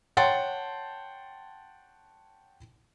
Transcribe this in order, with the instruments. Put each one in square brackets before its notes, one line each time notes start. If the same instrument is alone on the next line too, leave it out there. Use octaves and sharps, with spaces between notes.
[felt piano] C#5 F#5 G5 A5 C6 A6